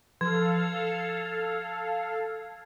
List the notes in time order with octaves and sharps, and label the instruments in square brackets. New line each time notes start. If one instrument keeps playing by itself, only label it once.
[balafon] F3 [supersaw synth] A4 F5 [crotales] G#6